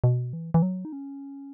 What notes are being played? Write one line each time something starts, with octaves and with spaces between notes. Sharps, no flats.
B2
E3
E3
F#3
D#4
C#4